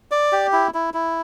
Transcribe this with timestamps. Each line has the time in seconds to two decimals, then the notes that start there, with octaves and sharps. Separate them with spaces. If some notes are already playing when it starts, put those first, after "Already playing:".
0.11 D5
0.32 G4
0.53 E4
0.74 E4
0.94 E4